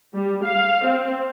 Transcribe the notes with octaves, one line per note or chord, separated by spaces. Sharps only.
G3
F5
C4